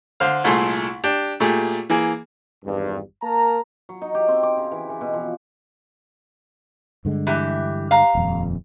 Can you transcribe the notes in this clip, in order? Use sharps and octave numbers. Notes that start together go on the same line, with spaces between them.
D3 C5 F5
C2 A#2 A3 G#4 A4 C6
D4 G4
A#2 A3 G4 G#4
E3 A#3 G#4
G#1 E2 G2
A#3 A#4 A5 A#5
F#3
D#4
G4
C4
D6
C#3
E3
E3
B2
F3
G2 D3 G#3
E3 G4 E5
F5 A#5
D#1 F2